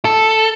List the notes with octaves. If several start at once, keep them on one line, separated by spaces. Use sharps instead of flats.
A4